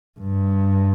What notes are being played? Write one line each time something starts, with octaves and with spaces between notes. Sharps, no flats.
G2